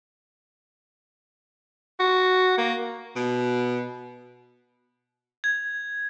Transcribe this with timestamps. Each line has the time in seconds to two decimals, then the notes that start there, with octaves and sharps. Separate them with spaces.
2.00 F#4
2.58 A#3
3.15 B2
5.44 G#6